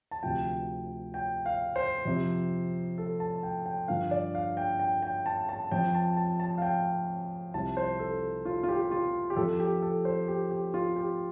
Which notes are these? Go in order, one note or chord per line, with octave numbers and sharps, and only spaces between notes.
A5
D2 C3 F3 G5
G5
F5
C5
F2 C3 F3
A4
A5
G5
G5
G2 D3 F3 F5
D5
F5
G5
G5
G5
A5
A5
F2 F3 G5
A5
A5
A5
F5
G5
C2 C3 F3 A5
C5
A4
F4
F4
G4
G4
F4
G4
F2 F3 A4
G4
A4
C5
G4
G4
F4
G4